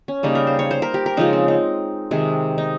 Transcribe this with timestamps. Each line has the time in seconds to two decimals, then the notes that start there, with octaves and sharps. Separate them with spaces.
0.08 C#4
0.23 C#3 G3 A#3 D#4
0.35 A#4
0.47 C5
0.59 C#5
0.71 C5
0.82 A#4
0.94 G4
1.06 A#4
1.17 C#3 F3 G#3 D#4
1.33 C4
1.48 D#4
2.11 C3 D#3 G#3
2.58 D#4